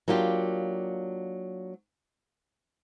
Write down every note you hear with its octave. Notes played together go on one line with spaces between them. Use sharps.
F#3 A#3 D4 F4 G4